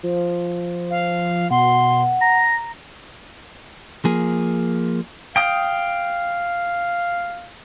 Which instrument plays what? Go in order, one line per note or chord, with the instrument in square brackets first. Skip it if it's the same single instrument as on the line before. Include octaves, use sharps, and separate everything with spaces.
[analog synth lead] F3
[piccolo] F5
[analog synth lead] B2 [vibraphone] F#5 [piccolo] C6
[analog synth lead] A#5 [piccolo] A#6
[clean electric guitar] F3 A#3 G#4
[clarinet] F5 [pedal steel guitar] G5 D#6